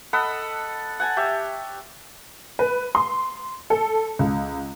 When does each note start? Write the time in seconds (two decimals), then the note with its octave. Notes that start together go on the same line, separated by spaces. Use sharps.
0.13 A4 D#5 F#5 B5
1.00 F#5 G#5 A5
1.17 G4 C#5 E5
2.59 B4
2.95 C6
3.70 A4
4.19 C#2